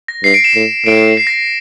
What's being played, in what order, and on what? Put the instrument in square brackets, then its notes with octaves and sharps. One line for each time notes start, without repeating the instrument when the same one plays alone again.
[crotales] A#6
[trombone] G2 [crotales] C7
[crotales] D7
E7
[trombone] A2
[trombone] A2 [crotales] D7
[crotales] C7
A#6